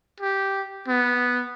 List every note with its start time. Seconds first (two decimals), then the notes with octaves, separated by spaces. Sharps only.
0.20 G4
0.88 B3